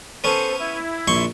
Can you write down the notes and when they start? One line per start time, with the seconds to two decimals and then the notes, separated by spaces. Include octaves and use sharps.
0.24 B3 C#4 A4 C5
0.58 E4
1.08 A#1 C6 C#6